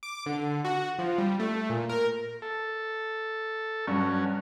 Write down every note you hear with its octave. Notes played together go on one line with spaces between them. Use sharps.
D6
D3
F#4
F3
G3
A3
A#2
A#4
A4
G2 F#3 C#4